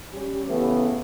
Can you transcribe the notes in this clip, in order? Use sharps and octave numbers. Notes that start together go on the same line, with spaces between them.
G3 C#4 G4
C#3 E3 A3 B3